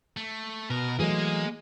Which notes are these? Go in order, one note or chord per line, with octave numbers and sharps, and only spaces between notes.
A3
B2 A#4
E3 F#3 A3 A#3 G#4 D#5